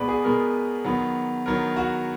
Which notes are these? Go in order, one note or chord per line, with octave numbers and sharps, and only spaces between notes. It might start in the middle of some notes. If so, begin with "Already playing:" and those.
Already playing: B2 G#3 B3 B4 D5
G#4
B2 G#3 B3 A#4
D#3 F#3 B3
D#3 F#3 B3 A#4
F#4